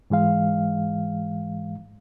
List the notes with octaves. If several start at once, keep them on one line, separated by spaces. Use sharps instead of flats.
G#2 E3 G#3 F5